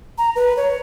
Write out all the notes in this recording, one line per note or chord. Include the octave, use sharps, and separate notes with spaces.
A#5
B4
C#5